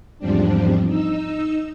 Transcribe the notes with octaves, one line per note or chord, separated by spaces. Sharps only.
E2 G#2 F3 G3 C4 D4
D#4 E6